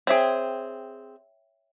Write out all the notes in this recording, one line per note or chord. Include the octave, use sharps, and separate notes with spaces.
C4 G#4 C#5 E5 G5